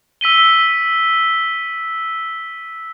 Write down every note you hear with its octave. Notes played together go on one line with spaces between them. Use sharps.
E6 B6 D#7 G7